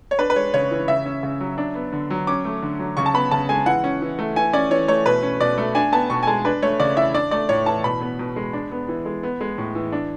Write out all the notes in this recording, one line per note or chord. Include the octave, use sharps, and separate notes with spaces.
C#5
D4 B4
B4
G#3 C#5
C#3 C#5
E3
C#3 E5
C#4
C#3
F#3
D4
B3
D3
F#3
C#4 D6
A3
D3
F#3
C#3 C#6
A5
B3 B5
C#3 A5
G#3 G#5
E3 F#5
C#4
E3
A3
E3 G#5
C#4 D5
E3 C#5
A3 C#5
B2 B4
C#4
B2 D5
A3
D4 G#5
B3 A5
B2 C#6
G#5
G#3 A5
D4 B4
A3 C#5
C#3 D5
E3 E5
D4 D5
A3 D5
A2 C#5
E3 A5
B2 B5
B3
B2
G#3
D4
B3
E3
G#3
B3
G#3
A2
E3
D4